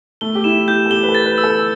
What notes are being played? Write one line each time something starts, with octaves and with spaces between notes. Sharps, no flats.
A3 G7
G4
E4 E7
G4 G6
A4
G4 G7
B4
A4
A6
B4
E6
A4